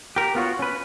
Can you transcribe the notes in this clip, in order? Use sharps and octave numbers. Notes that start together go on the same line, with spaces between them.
G4 A#4
B3 F4 F#4 C#5
C#4 B4